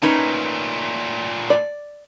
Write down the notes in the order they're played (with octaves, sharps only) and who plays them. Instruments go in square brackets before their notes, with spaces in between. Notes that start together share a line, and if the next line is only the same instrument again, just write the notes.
[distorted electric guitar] A#2 A3 [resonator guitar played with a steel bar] C#4 D#4 B4
[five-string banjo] D5